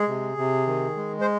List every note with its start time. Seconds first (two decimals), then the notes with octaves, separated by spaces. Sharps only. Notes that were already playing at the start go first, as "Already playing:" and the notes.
Already playing: G#3 G#4
0.08 C3
0.37 C3
0.67 D#3
0.96 G#3
1.21 C5